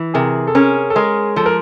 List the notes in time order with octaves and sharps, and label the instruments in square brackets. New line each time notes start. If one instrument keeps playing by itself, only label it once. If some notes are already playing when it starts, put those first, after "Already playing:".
Already playing: [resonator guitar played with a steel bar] E3
[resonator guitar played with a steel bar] C3 [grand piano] G#4 A#4
[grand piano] A4
[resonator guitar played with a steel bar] C#4 [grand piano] G#4 A#4
[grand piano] A4
[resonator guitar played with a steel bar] G#3 [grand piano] G#4 A#4
[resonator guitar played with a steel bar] F3 [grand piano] A4
[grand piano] A#4